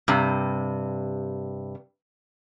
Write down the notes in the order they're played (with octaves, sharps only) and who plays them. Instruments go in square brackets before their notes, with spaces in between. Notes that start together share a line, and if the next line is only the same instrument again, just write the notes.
[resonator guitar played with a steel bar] G2 C3